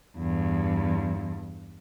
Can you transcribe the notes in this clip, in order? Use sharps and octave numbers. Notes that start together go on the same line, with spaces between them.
E2 G2